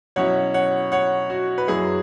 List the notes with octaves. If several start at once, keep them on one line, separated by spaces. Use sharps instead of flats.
B2 F#3 C#4 E4 C#5 F#5
C#5 F#5
C#5 F#5
F#4
B4
F#2 F#3 E4 G#4